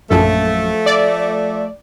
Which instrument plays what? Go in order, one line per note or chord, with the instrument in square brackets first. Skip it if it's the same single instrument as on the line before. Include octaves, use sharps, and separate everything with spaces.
[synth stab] A#1 F#2 A4 [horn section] F3 A3
[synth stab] D5